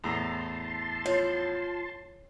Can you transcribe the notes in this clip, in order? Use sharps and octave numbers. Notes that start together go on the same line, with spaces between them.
E2 A2 A5 A#5 C6
F3 C#5